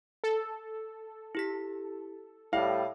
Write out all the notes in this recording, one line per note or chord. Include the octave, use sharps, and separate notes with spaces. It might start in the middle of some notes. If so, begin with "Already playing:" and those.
A4
E4 G4 B6
A2 G3 E4 F5